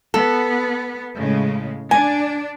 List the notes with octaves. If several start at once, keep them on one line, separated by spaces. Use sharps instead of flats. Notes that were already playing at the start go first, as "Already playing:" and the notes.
B3 A4
A2 C#3 G#3
D4 G#5